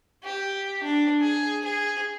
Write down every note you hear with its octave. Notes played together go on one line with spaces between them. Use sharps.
G4
D4
G#4
G#4